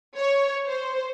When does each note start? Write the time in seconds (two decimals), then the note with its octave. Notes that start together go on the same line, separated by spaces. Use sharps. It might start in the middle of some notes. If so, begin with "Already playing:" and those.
0.18 C#5
0.68 C5